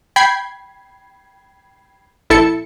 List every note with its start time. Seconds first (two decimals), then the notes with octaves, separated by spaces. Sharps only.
0.16 G5 B5 G#6 C7
2.30 A#1 E4 A4 A5 C#7